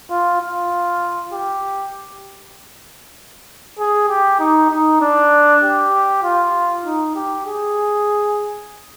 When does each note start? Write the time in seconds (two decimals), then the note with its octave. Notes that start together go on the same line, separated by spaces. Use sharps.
0.10 F4
0.41 F4
1.33 G4
3.79 G#4
4.09 G4
4.40 D#4
4.71 D#4
5.01 D4
5.63 G4
6.23 F4
6.85 D#4
7.16 G4
7.46 G#4